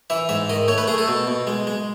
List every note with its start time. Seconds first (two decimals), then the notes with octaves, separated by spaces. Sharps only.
0.10 E3 E5
0.29 G#2 E5
0.49 D#3 D#5
0.68 A3 C#5
0.78 B4
0.88 A3 G#4
0.98 A4
1.08 B2
1.28 B2
1.47 G#3
1.67 G#3